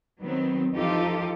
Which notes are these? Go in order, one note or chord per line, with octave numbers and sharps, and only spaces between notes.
D#3 F#3 B3 C4
E3 F3 D#4 F4 G4 A4